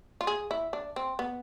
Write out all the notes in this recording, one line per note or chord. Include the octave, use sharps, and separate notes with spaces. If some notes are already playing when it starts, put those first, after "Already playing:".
F4
G#4
E4
D4
C4
B3